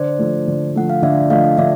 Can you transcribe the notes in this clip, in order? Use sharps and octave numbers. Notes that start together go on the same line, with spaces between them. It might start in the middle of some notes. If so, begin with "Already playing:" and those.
Already playing: D3 C5 D5
F3 A3
D3
F3 A3 F#5
F5
D3 D5 E5
F3 A3 D#5 F5
D3 D5 E5